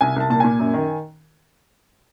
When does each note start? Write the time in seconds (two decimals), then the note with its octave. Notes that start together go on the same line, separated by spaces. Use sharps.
0.01 C2 G#5
0.16 C2 A5
0.30 A#2 A5
0.40 A#2 G#5
0.59 F#2
0.74 D#3